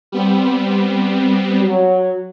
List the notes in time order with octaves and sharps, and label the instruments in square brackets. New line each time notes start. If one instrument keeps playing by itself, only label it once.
[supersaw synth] G3 B3 C4
[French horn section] F#3